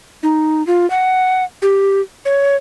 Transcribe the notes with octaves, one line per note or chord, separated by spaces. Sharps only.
D#4
F4
F#5
G4
C#5